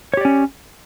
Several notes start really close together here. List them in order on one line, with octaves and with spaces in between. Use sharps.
C#5 G4 D5 C#4